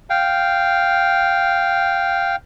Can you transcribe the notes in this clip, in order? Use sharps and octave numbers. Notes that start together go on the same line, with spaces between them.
F5 G5